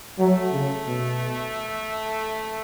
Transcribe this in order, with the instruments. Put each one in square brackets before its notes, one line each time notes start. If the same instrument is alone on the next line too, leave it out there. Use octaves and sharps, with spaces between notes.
[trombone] F#3 [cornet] A3
[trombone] C#3
B2